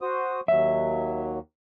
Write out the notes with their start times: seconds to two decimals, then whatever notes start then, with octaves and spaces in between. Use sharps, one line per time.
0.01 F#4 C5 D#6
0.48 D#2 F#3 E5